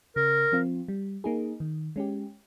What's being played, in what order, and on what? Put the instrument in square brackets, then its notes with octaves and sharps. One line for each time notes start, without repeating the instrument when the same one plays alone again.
[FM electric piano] C#3 [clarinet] A#4
[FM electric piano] F3 C4 F4
G3
A#3 D#4 G#4
D#3
G#3 C#4 G4